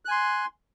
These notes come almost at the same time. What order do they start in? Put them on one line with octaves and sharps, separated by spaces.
F#6 G#5 C6